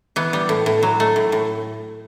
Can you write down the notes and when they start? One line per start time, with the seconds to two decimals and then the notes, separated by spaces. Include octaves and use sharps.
0.16 E3 B3
0.33 G3
0.49 A2
0.66 A2
0.83 F#3
1.00 A3
1.16 A2
1.32 A2